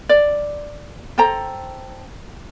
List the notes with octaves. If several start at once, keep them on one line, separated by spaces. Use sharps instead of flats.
D5
A4 C5 G5 A#5